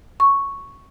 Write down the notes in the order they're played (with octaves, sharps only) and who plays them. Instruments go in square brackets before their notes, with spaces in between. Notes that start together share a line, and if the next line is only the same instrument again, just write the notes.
[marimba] C#6